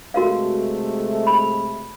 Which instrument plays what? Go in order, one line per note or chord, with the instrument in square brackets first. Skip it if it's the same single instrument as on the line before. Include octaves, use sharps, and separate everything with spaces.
[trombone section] C3 G#3 A3 [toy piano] F#4 A#4 F5
[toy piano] B5